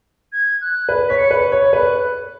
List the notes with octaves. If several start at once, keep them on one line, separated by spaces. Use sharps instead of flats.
G#6
F#6
B4
C#5 B6
C#7
B4
C#5
B4 F#6